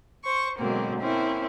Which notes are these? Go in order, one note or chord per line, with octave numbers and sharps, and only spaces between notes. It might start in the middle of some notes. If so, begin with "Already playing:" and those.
C5 C#6
B2 D3 F#3 G#3 A#3 C4
A#3 C4 C#4 E4